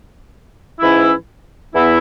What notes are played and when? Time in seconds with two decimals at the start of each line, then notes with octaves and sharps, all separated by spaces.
0.79 G#2 E3 C#4 E4
1.73 E2 E3 B3 E4